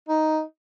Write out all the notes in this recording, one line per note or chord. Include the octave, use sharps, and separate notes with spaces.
D#4